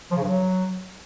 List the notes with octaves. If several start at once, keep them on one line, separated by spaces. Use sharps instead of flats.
F3
C#3
G2
F#3